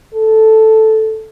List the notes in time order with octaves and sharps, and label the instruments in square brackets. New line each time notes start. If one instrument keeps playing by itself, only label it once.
[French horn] A4